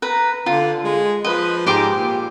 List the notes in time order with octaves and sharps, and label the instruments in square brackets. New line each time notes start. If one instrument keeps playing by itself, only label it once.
[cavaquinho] B4 A#5
[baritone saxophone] D3 [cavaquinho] F4
[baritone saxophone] G#3
[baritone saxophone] F3 [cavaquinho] B4 D#5
[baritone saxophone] G#2 [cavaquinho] G4 C6 D6
[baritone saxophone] A#2